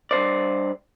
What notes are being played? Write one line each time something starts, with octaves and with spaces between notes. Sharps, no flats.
G2 C#3 C5 D5